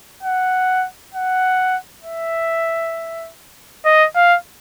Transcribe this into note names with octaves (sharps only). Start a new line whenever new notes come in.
F#5
F#5
E5
D#5
F5